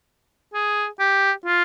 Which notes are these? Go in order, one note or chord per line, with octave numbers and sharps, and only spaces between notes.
G#4
G4
F4